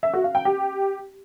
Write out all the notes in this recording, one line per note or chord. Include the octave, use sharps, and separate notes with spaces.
E5
F#4
F5
G5
G4